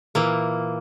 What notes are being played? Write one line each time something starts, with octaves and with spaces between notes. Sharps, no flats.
A#2 E3 A#3